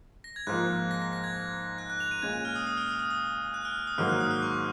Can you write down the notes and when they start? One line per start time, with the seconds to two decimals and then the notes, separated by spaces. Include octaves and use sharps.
0.24 A#6
0.36 G#6
0.47 G#2 F3 A#3 F#6
0.91 A#6
1.02 A#6
1.13 A#6
1.24 G#6
1.78 F#6
1.90 F#6
2.00 F7
2.11 D#7
2.22 A#2 G#3 C#4 G#6
2.33 F#6
2.45 F6
2.56 D#6
2.67 D#6
2.77 F6
2.89 D#6
2.99 D#6
3.11 D#6
3.54 F#6
3.65 F6
3.87 D#6
3.98 G#2 D#3 F#3 A#3 F6
4.09 F#6
4.20 D#6
4.31 F6
4.42 C#6